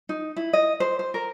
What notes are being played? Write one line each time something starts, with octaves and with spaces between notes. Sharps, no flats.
D#4
E4
D#5
C5
C5
A#4